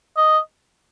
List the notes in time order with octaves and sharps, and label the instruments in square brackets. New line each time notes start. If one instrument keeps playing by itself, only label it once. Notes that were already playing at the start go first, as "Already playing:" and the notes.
[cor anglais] D#5